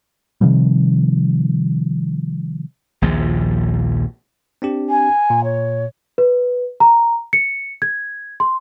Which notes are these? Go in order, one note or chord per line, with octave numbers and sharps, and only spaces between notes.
C3 D#3 F3 G3
A#1 D#2 A#2 F3
C4 D4 G4
G#5
A#2
C#5
B4
A#5
C#7
G#6
C6